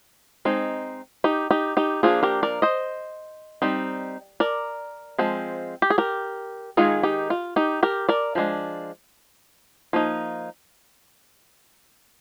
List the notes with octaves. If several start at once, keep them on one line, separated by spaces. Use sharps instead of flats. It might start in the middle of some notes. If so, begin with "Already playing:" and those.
G#3 C4 D#4
D#4 G4
D#4 G4
D#4 G4
F3 A#3 D4 F4 G#4
G4 A#4
A#4 D5
C5 D#5
G3 C4 D#4
A#4 D5
F3 G#3 C4
G4
G#4
G4 A#4
D#3 G#3 D#4 F4 G#4
D#4 G4
F4
D#4 G4
G4 A#4
A#4 D5
F3 G#3 D4
F3 A#3 D#4